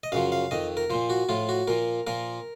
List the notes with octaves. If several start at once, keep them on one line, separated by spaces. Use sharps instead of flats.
D#5
F#2 C#3 F3 F5
F5
F2 D#3 D#5
A#4
A#2 F3 C5
F#4
A2 F3 F4
F#4
A#2 F3 A#4
A#2 F3 A#4